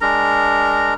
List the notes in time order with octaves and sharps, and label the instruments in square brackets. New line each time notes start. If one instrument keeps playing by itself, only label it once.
[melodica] G#3 D4 A#4 A#5